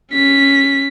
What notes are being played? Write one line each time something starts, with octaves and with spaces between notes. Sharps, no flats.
C#4 B6